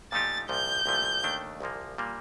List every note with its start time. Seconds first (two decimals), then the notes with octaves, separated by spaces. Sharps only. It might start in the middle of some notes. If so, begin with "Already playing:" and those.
0.12 A#2 F3 A3 D#4 G4 A6
0.49 C2 A#2 F3 G6
0.86 C2 A#2 F3 A3
1.24 D#2 D#3 A3 D4
1.61 C2 A#2 F3 A#3
1.98 A#2 G3 A#3